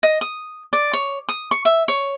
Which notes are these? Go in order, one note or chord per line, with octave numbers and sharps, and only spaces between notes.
D#5
D#6
D5
C#5
D#6
C#6
E5
C#5